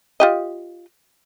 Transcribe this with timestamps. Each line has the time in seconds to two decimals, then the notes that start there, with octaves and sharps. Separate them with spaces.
0.20 F4 G4 D#5